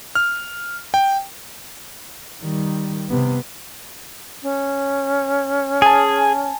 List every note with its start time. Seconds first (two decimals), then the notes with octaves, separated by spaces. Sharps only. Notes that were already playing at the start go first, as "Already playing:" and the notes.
0.15 F6
0.94 G5
2.42 D#3 G3
3.09 C3 B3
4.42 C#4
5.82 G#4 G#5 A5